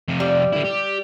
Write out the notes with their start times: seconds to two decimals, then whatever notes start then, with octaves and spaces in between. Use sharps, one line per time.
0.08 F2 C3
0.20 G3
0.53 D3 E4
0.65 G4